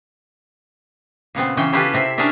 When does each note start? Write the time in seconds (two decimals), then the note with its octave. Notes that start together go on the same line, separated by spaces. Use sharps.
1.35 A#2 C#3 B3 C4
1.57 C#3 E3 C#4 G5
1.73 C#4 E4 F4 G4 A4 B4
1.94 C3 C4 E5
2.18 C#4 D4 G#4 A#4 D5 E5